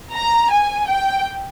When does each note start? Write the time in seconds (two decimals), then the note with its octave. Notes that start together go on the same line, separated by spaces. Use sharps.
0.13 A#5
0.50 G#5
0.87 G5